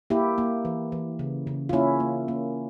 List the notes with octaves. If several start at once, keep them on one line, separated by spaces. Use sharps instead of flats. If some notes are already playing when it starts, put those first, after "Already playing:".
A#3 E4 G4
A#3
E3
E3
C#3
C#3
F4
A#3 C#4 E4
A#3
A#3